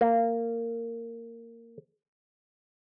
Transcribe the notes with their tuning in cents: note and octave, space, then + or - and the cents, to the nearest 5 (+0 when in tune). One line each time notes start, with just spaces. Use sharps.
A#3 -15